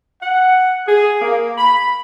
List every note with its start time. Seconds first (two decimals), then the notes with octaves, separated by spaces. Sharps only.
0.22 F#5
0.88 G#4
1.22 A#3
1.58 B5